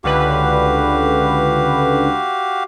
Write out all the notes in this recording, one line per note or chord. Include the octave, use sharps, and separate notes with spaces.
C#2 D3 F#4 G4 B4 F5